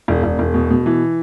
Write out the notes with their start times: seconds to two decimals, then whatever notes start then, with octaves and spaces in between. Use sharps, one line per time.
0.08 E1
0.23 E1
0.39 E1
0.54 B2
0.70 B2
0.86 E3